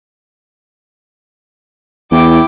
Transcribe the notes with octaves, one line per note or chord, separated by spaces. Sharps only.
E2 E4 G5 D6